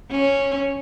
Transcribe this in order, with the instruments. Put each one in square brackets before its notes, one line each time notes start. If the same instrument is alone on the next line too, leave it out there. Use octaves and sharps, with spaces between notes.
[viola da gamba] C#4